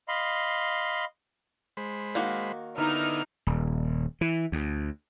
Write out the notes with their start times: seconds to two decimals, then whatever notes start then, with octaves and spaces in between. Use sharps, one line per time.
0.08 D#5 F5 B5 C6
1.77 G#3 C5 B5
2.15 D#3 A#3 F#4
2.78 D3 B3 D#4 E4 F6
3.47 D#1
4.21 E3
4.52 D2